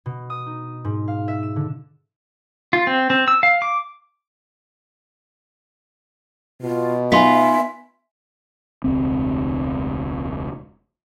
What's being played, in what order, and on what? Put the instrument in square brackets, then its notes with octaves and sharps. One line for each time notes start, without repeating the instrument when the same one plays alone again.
[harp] B2
D#6
D#4
G#2
F5
E5
E7
D3
[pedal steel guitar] F4
C4
C4
E6
F5
D6
[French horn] B2 [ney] F4
[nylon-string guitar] B3 D#4 F4 [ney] E5 [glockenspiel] G#5 C6 B6
[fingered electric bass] E1 C#2 C4